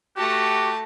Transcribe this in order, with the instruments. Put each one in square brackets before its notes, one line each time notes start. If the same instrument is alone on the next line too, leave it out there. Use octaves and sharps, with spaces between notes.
[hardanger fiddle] A3 A5 [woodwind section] F#4 [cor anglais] G4